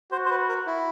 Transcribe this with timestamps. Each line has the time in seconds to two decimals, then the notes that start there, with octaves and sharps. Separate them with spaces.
0.12 F#4 C5
0.25 C5
0.30 B4
0.49 A#4
0.66 E4